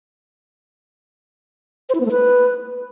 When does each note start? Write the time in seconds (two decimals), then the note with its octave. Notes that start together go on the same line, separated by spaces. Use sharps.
1.89 C5
1.95 E4
2.00 B3
2.06 A3
2.11 B4